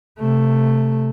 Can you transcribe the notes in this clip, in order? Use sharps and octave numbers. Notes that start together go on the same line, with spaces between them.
C3 A3